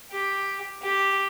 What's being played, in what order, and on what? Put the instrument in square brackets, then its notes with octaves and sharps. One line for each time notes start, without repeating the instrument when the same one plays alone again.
[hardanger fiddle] G4
G4